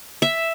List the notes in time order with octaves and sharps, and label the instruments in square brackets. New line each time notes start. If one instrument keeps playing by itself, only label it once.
[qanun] E5